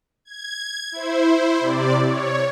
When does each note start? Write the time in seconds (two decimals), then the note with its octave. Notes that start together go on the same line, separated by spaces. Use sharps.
0.25 G#6
0.92 E4 C5
1.60 C3 D5
2.06 C#5